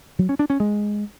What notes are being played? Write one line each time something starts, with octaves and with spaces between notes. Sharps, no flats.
F#3
C#4
D4
C#4
G#3